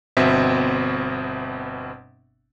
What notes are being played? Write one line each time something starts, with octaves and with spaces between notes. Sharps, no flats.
G1 B2 C4 E5 B6